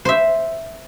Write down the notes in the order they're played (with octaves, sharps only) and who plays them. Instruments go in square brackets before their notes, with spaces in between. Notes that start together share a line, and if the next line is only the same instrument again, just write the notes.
[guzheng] C5 E5